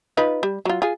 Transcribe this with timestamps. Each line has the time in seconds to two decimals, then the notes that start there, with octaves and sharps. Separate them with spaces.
0.17 D#4 F4 B4
0.43 G3
0.65 F#3 F4
0.82 F4 G#4